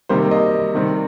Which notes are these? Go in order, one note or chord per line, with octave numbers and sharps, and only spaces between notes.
C3 D#3 G3 A#3 C5
D#5
C3 D#3 G3 C4